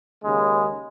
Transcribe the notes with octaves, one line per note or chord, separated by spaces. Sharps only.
D#2 C#3 G#3